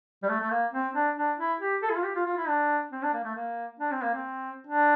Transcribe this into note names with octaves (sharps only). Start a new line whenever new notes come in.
G3
A3
A3
A#3
C4
D4
D4
E4
G4
A4
E4
F4
G4
F4
F4
E4
D4
C4
D4
A#3
A3
A#3
D4
C4
A#3
C4
D4